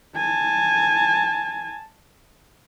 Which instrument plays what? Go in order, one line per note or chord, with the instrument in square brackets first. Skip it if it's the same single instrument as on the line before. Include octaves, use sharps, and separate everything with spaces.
[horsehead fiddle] G#5 A5